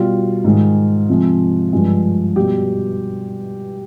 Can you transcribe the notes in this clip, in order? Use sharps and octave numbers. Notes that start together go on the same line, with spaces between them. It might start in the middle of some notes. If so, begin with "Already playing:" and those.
Already playing: B2 G3 F4
G#2 D#3 G#3
C3 F3 G#3
G2 F3 G#3
B2 G3 G4